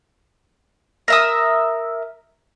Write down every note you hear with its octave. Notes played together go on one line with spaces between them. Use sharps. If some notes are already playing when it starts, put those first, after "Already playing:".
A#4 E5 D#6